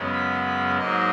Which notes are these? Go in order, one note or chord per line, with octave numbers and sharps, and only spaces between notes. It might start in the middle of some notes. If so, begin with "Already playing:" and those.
Already playing: F#2 C#3 G#3 B3
B5
G#2 F#3 A#3 D#5